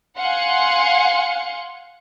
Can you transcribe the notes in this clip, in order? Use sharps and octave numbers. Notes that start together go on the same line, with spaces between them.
F5 F#5 G#5 C6 C#7